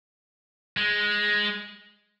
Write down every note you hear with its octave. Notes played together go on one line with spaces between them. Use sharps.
G#3